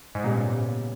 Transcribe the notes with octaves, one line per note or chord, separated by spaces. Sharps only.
G#2
A#2 C#3 G3 B3 G4